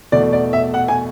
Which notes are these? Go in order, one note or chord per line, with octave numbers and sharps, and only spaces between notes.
E2 B2 A3 D5
D5
E5
F#5
G#5